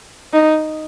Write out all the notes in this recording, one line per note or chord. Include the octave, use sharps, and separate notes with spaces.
D#4